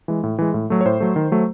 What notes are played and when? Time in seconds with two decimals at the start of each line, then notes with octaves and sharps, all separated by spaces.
0.08 E3 G#3
0.23 A2
0.39 E3 G#3
0.54 A2
0.70 F#3 A3
0.81 C#5
0.85 A2 C5
1.00 F#3 A3
1.16 D#3
1.32 F#3 A3